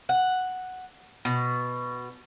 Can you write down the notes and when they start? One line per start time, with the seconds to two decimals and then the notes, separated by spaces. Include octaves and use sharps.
0.09 F#5
1.25 B2